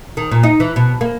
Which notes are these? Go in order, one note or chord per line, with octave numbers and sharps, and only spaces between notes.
D#3
A#2
D#4
E3
B2
A#3